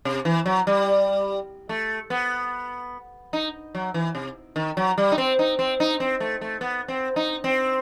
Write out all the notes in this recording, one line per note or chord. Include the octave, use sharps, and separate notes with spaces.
C3
E3
F#3
G3
A3
B3
D#4
F#3
E3
C3
D#3
F#3
G3
D#4
C4
D#4
C4
D#4
C4
A3
A3
B3
C4
D#4
C4